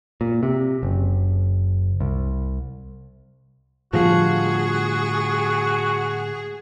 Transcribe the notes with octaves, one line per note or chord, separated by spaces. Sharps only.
A#2
C3
F#1
C2
A2 D3 F3 G3 F#4 G#4